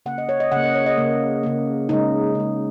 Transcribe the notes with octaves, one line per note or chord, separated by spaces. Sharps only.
C#3 A#3 F#5
D#5
C#5
D#5
C#3 A#3 F#5
D#5
C#5
D#5
C#3 A#3
C#3 A#3
C#3 G#3 D#4
C#3 G#3